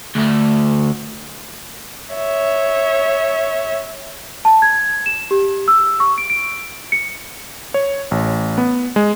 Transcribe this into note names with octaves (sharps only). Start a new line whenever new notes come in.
D2 A3
C#5 E5
A5
G#6
E7
G4
E6
C#6
D7
D7
C#7
C#5
A1
B3
G#3